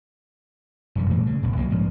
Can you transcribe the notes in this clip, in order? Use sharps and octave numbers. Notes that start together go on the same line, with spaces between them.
E1 F#2 G3
A#2 E3 A3 A#3
C#3
D#1 B1
C2 F#3 G3 A#3
G#2 F3